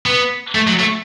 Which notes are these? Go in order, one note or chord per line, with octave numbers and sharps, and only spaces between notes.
B3
A3
F#3
A3